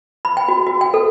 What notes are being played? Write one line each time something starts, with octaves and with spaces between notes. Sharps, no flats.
B5
G5
F#4
F#4
G5
A4